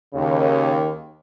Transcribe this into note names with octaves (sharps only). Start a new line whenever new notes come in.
D#2 C#3